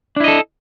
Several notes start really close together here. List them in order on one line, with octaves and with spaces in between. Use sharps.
D4 E4 D#5 A4